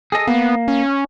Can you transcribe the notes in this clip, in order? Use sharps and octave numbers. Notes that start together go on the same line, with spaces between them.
G#4 A4 D#5
A#3 B3
C#4